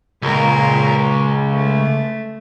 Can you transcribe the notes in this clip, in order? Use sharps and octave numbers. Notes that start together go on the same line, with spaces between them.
C#2 A#2 A#4
A3